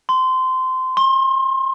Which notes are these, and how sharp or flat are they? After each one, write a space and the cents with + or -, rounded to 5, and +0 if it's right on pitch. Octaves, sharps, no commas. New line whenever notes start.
C6 -20
C6 +35